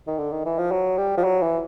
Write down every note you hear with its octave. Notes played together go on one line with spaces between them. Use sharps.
D#3
D3
D#3
E3
F3
F#3
G3
F3
F#3
E3